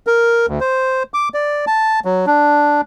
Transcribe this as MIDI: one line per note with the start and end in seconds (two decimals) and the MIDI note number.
0.07 0.46 70
0.48 0.59 38
0.60 1.03 72
1.14 1.29 86
1.34 1.65 74
1.67 2.00 81
2.05 2.26 54
2.27 2.81 62